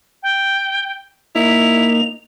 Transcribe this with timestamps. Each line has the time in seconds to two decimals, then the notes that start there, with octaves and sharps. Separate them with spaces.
0.23 G5
1.35 A#3 D#4 E4 F7